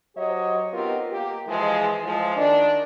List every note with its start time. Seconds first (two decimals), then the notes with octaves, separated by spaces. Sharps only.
0.16 F#3 G4 C5 C#5 D#5
0.73 B3 C4 D#4 F4 G4 A#4
1.13 A#3 G4
1.47 E3 F3 G#3
2.05 A2 F3 G#3
2.37 D#3 D4